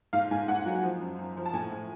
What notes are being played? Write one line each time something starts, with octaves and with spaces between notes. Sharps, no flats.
G#2 F5
G#2 G#5
G#2 F#5
F#3
F3
F#2
F#2
F3
A5
A2 G#5
A2